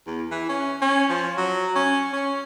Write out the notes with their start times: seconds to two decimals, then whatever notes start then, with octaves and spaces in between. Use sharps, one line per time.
0.07 E2
0.31 E3
0.49 C#4
0.82 C#4
1.10 F3
1.37 F#3
1.76 C#4
2.13 C#4